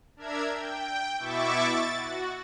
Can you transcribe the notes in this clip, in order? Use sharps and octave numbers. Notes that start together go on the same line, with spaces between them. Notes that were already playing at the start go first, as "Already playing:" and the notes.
D4 A#4 E5 G#6
G5
B2 E4 E5 C#6 D6 A6
A6
F#4